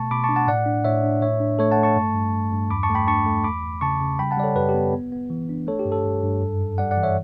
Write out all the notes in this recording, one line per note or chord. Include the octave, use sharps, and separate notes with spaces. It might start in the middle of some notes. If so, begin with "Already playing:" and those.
Already playing: B2 A3 A5 C#6
B2 B5 D6
D4 A5 C#6
F#5 A5
A2 D5 F#5
D4
A2 C#5 E5
D4
A2 C#5 E5
D4
A3 A4 C#5
F#5 A5
A3
A5 C#6
G2
G2
G2
G2
E2 B5 D6
A5 C#6
A3
G5 B5
D4 A5 C#6
A3
E2 B5 D6
E2
C#3 A5 C#6
C#3
G3 G5 B5
F#5 A5
G3 D5
A4 C#5
F#2 G4 B4
G4
B3
B3
B3
E3
D4
A3 A4 C#5
G4
G2
A4
G2
G2
F#2
F#2
G3 D5 F#5
D5 F#5
E3
C#5 E5